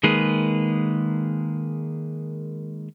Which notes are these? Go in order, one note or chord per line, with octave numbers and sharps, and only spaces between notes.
D#3 G#3 A#3 G#4 B4